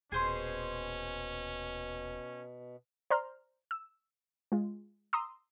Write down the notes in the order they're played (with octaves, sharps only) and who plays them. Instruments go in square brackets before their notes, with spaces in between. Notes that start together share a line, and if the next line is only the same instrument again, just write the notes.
[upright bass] D#1 [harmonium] B2 [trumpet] C#4 [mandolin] G#4 C5 C6
[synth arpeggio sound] C5 D5 A#5 C6 F6
E6
G#3 F4
A#5 C6 D#6 E6